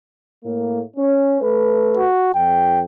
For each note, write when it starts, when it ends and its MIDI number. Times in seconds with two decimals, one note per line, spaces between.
0.44 0.80 45
0.44 0.80 58
0.97 1.36 61
1.41 2.04 57
1.41 2.04 71
1.97 2.32 66
2.35 2.84 41
2.35 2.82 79